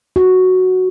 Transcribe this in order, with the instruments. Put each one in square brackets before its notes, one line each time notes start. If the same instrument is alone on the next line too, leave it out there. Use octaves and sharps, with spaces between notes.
[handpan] F#4